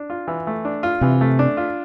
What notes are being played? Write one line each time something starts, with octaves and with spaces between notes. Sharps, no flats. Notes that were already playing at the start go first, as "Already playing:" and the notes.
Already playing: D4
F4
E3
A3
D4
F4
C3 E3
A3
D4
F4